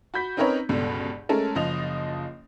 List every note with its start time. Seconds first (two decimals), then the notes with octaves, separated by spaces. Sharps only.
0.14 F#4 B5 G6 B6
0.37 C4 C#4 D#4 A#4 B4 C#5
0.69 G1 C#2 G2 B2 D3
1.29 G#3 A3 C#4 A4 A#4
1.55 F#1 F3 D#5 F7